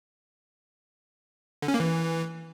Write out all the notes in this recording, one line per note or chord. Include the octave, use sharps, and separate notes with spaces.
D3
C#4
A#3
E3